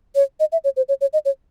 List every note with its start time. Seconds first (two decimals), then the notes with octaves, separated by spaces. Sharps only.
0.15 C#5
0.40 D#5
0.52 E5
0.64 C#5
0.77 C5
0.89 C#5
1.01 C#5
1.13 D#5
1.25 C#5